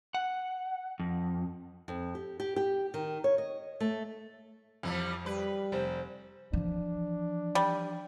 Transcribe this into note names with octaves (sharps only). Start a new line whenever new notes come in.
F#5
F2
F2
G4
G4
G4
D#3
C#5
D#5
A3
F2 E3 F3 G3
G3 B4
F1 C5
E3 F3 D4
G3